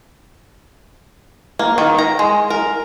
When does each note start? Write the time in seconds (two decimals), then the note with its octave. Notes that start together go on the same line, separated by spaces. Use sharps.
1.59 A#3
1.78 D#3
1.99 A#5
2.19 G#3
2.50 A#4